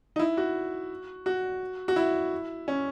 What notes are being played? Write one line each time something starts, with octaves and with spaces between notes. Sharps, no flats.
D#4
E4
F#4
F#4
F#4
E4
C#4